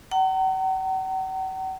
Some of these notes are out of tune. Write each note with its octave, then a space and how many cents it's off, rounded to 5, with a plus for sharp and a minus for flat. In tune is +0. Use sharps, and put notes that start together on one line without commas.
F#5 +45 A#5 -35